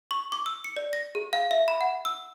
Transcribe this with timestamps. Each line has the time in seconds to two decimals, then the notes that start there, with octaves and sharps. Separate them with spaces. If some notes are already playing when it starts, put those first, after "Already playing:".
0.11 C#6
0.32 D6
0.46 E6
0.64 C#7
0.76 D5
0.93 A#6
1.15 G#4
1.33 F5
1.51 E5
1.68 B5
1.81 F#5
2.05 E6